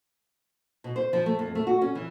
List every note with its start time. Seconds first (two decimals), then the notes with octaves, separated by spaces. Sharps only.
0.84 B2
0.96 C5
1.13 F3
1.26 A3
1.39 F2
1.55 A3
1.67 F#4
1.82 C#4
1.95 E3